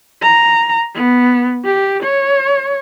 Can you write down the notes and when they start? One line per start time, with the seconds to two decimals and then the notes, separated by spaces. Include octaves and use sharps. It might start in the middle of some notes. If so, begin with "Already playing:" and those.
0.22 A#5
0.95 B3
1.64 G4
2.02 C#5